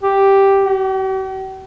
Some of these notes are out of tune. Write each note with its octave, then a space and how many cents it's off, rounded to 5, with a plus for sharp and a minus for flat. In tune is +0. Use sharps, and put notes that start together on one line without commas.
G4 +0
G4 -45